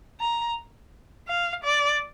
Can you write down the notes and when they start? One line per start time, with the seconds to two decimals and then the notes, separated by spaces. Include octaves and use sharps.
0.20 A#5
1.28 F5
1.64 D5